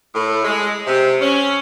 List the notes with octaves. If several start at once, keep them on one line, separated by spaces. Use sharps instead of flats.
A2
G#3
C3
C#4